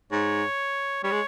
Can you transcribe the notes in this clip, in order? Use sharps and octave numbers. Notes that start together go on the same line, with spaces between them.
G#2 C#5
G3 C#5
G#3